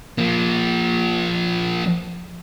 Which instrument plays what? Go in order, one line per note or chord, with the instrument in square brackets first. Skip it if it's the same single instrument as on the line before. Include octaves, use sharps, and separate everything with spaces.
[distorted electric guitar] F3 A#3